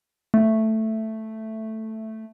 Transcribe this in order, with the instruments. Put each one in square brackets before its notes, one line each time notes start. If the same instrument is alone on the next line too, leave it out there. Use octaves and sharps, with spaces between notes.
[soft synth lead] A3